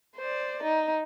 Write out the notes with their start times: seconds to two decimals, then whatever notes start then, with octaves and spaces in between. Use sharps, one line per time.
0.17 C5 D5
0.63 D#4